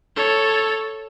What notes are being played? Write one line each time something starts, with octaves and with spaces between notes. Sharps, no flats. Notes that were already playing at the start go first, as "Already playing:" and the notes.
A4 C#5